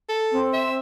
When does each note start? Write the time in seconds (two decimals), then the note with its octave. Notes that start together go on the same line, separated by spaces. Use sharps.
0.09 A4
0.32 C4
0.53 E5